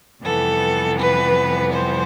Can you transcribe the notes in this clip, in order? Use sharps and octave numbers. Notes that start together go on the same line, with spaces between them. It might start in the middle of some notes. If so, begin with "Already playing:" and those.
F2 C3 E3 G3 B3 A4
B4
C5